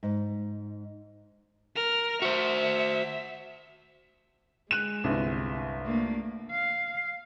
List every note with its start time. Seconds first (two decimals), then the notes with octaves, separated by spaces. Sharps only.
0.03 G#2
1.75 A#4 F6
2.22 F#4 C5 E5
4.71 G#3 F#6 D#7 E7
5.04 G1 C2
5.85 A3 A#3 D4
6.51 F5